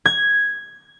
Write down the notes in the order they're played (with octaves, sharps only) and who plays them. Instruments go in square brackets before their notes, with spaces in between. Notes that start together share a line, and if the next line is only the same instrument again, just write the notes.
[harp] G#6